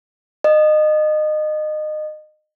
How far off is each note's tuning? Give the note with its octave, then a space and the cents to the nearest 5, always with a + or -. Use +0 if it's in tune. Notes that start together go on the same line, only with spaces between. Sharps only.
D#5 -25